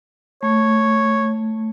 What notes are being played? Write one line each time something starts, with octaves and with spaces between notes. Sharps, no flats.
A3 C#5